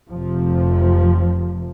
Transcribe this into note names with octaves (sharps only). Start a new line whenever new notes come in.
F1 F2 C3 F3